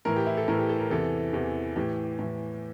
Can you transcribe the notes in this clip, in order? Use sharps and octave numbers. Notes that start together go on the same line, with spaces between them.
A2 E3 A#4
G4
E4
A4
A2 E3 A#4
G4
A4
A#4
E2 C3 E3 A4
E2 C3 E3
A2 E3 G4
A2 E3